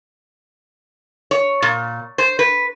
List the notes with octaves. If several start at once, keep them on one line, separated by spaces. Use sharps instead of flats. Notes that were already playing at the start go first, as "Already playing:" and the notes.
C#5
A#2
C5
B4